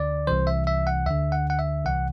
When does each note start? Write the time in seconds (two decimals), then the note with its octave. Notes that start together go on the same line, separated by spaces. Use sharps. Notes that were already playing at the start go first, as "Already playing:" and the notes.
Already playing: D2 D3 D5
0.27 C2 C3 E3 C5
0.47 E5
0.67 E5
0.87 F#5
1.06 D2 D3 E5
1.32 F#5
1.50 F#5
1.59 E5
1.85 C2 C3 E3 F#5